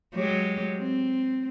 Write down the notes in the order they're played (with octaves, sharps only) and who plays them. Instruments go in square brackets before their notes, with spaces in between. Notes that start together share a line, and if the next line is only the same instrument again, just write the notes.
[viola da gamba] F#3 G#3 G4
C4